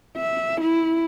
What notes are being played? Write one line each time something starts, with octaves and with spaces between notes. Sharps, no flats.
E5
E4